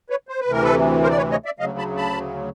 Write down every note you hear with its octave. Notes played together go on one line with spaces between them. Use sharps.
B4 C#5
C5
B4
D2 C3 E3 A#4
A4 B4
A#4 C5
D5
B4 C#5
C#5 D#5
D5 E5
D2 C#3 F#3 D#5 F5
A5 B5
A5 B5